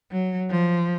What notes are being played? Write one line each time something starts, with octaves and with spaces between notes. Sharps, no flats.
F#3
F3